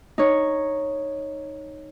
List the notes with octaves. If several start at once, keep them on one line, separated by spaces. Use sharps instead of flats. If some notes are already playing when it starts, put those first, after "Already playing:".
D#4 C#5